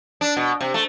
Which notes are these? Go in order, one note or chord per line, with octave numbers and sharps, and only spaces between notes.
D4
B2
C3
A3